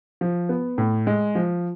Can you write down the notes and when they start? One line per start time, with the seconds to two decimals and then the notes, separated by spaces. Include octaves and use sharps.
0.21 F3
0.49 B3
0.78 A2
1.07 G#3
1.35 F3